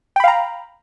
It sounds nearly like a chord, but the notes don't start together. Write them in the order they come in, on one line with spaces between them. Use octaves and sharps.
G5 B5 F5 A#5